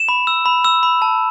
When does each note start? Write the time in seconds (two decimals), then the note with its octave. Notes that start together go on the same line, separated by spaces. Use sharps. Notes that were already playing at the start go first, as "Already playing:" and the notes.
Already playing: E7
0.09 B5
0.27 E6
0.46 B5
0.65 E6
0.83 B5
1.02 A5